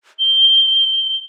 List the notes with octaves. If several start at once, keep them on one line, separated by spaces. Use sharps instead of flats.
G7